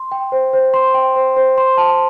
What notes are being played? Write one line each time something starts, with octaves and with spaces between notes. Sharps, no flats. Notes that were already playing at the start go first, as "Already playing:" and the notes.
Already playing: C6
G5
C5
C5
C6
G5
C5
C5
C6
A5